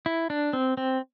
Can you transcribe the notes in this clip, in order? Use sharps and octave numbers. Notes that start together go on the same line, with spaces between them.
E4
D4
C4
C4